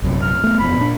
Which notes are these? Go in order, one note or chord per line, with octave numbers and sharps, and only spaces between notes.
A#1 F#2 C3
F6
A3 B3
E1 F2 B3 B5
A#2 D4